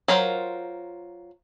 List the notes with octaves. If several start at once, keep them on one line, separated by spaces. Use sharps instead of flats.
F#3 F4 A#4 C5